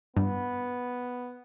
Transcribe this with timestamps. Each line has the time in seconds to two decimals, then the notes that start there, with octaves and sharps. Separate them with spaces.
0.16 G2 B3